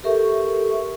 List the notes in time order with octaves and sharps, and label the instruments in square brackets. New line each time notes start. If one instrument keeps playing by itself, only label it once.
[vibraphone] G4 A4 A#4 E5 C#6